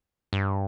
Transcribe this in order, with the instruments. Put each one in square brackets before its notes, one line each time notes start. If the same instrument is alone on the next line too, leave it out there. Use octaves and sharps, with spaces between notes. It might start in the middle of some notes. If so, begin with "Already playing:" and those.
[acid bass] G2